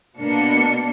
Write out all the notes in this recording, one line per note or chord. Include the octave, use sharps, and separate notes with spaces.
B2 A#3 D4 C#7